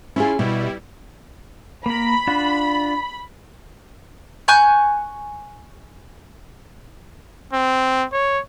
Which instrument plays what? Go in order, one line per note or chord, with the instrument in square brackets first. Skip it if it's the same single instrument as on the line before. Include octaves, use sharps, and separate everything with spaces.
[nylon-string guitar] C#4 G#4 [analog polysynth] E4 F4
[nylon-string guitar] B2 [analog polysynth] G3 E4
[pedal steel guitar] A#3 A#4 [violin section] B5
[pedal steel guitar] D4 F4 F#5
[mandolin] G#5 C#6 F#6 G6
[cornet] C4
C#5